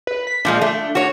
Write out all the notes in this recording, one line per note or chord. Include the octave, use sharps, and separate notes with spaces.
B4
B6
A#2 F3 G#3 D4
A3
F#4 C#5